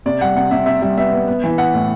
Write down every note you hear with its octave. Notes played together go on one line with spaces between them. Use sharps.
C3 D5
G3 F#5
C3 F#5
C3 E5
C3 E5
G3 E5
B3 E5
B3
B3
E3
B3 F#5
A2